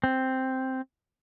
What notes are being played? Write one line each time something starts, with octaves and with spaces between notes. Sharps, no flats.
C4